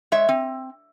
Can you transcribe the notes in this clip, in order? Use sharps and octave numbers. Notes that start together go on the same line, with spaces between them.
G#3 C#5 E5
C4